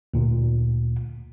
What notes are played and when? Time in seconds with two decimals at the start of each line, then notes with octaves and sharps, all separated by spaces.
0.14 D2 A#2